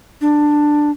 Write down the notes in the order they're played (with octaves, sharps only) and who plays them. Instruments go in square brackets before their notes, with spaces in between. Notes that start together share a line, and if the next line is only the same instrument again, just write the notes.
[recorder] D4